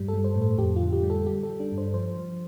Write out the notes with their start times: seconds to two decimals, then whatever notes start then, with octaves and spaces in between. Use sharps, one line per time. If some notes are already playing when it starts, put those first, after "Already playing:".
Already playing: G2 G3
0.08 A4
0.14 G3
0.24 C5
0.36 A2
0.42 A4
0.58 F2 G4
0.76 F4
0.82 D3
0.93 G4
1.03 G3
1.10 A4
1.26 G3 G4
1.43 A4
1.50 G3
1.60 D4
1.72 G2
1.78 C5
1.94 F3 C5
2.17 F3